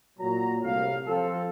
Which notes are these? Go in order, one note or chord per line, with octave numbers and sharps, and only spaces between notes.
A#2 F#3 A#5
C2 A2 F5
F3 C4 F4 A4